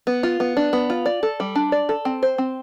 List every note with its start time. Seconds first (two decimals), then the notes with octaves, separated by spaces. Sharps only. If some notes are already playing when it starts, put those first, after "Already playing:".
0.07 B3
0.23 F4
0.40 B3
0.57 D4
0.73 B3
0.90 F4
1.06 D5
1.23 A4
1.40 G3
1.56 D4
1.72 D5
1.89 A4
2.05 C4
2.23 C5
2.38 C4